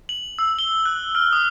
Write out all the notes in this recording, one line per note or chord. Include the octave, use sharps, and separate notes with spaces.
F#7
E6
G7
F#6
F6
D#6